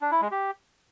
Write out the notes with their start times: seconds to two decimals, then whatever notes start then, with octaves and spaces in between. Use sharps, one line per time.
0.01 D4
0.11 E4
0.21 G#3
0.31 G4